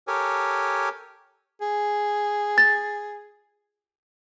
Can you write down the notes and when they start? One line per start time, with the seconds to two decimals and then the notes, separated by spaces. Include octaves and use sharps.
0.07 G4 A4 A#4 C#5 G#5
1.61 G#4
2.58 A6